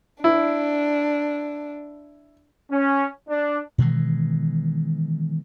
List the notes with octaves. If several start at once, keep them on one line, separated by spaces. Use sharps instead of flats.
D4 E4
C#4
D4
B2 D#3 E3 G#3